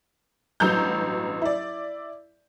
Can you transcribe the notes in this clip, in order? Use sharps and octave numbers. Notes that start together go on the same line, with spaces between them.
A1 G2 F#3 A#5 G6
E4 D5